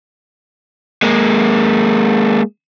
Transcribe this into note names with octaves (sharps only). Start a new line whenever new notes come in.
G#3 A#3